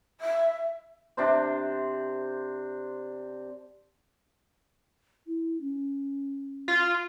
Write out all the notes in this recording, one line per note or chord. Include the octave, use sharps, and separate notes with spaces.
E5
C3 D4 C5
E4
C#4
F4